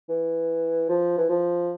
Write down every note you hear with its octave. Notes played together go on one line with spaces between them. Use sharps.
E3
F3
E3
F3